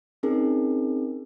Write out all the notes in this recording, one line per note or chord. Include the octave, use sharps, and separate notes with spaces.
C4 C#4 D#4 G#4 A#4